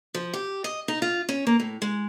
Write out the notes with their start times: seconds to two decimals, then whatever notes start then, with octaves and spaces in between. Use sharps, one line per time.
0.14 F3
0.34 G4
0.64 D#5
0.88 D#4
1.02 F4
1.29 C#4
1.47 A#3
1.60 A2
1.82 G#3